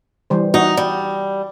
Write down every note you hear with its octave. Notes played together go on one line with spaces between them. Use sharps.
E3 G3 C5
D#4 F#4
G3